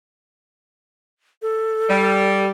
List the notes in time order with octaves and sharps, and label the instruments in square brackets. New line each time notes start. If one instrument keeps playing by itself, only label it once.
[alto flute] A4
[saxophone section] G3